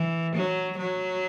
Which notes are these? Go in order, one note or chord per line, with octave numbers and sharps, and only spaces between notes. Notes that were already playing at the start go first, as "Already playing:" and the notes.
Already playing: E3
F#3
F#3